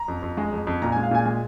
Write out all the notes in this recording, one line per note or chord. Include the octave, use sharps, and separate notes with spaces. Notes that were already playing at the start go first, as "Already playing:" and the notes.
Already playing: A#5
F2
F2
G#3
F2
F2
A#2 A#5
G#5
G#3
F5
A#2 G#5
G#3 G#5